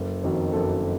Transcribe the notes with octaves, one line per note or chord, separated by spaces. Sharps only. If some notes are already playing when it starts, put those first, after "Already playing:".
Already playing: F#1 A4
F2 D#3 F#3
F#1 A4